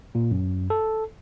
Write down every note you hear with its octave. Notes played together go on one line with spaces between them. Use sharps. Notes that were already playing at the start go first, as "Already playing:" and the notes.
A#2
F#2
A4